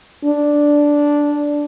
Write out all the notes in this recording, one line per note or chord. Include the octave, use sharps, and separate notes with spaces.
D4